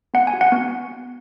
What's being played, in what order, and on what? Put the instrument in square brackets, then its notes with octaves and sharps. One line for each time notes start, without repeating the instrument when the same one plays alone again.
[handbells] B3 F#5
G#5
F#4
F#5
B3